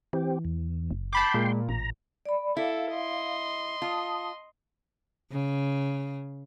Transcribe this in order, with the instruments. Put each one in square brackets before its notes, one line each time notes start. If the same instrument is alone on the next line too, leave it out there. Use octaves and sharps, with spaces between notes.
[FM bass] E3 [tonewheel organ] C4 G4
[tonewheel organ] E2
[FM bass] F#1
[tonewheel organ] G5 C6 [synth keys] A5 B5 D6
[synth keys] A#2 [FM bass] G#3
[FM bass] A1 [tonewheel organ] A#5
[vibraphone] D5 B5
[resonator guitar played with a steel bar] E4 [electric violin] A4 [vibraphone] F5
[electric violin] D#5 C6
[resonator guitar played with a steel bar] F4 [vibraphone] A5 D#6
[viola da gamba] C#3